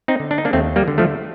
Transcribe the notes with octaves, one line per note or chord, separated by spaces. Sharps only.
C4 D#4
D3
D4
D#4
A#3 D4
D#2 A3 C4
G3 A#3
D3
F3 A3